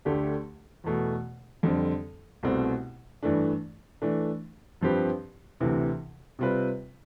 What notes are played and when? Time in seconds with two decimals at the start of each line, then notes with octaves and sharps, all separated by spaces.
0.05 D2 D3 A3 D4 G4
0.84 E2 B2 A3
1.63 F2 D3 G3 C4
2.43 C2 B2 A3 C4
3.23 G2 E3 A3 D4
4.02 E3 A3 D4
4.81 G2 F3 C4 G4 B4
5.60 D2 C3 E3
6.39 C3 G3 C4 F4 B4